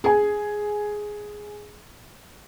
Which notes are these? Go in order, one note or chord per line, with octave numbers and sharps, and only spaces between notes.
G#4 G#5